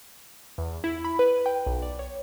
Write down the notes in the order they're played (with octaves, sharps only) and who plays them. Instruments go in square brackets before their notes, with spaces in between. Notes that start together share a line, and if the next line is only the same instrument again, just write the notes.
[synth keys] E2
E4
B5
B4
G5
B1
D5
C#5